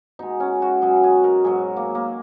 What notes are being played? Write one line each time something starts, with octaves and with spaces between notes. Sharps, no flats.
B2 G#3 D#4
C#4
F#4
B2 F#3 G#4
G#4
A#4
G#2 F#3 G#4
A#3
A#3